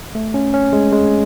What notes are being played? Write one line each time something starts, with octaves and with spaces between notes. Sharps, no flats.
A3
C#4
C#4
G#3
G#3